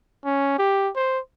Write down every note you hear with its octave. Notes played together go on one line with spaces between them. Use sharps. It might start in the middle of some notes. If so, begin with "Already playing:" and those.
C#4
G4
C5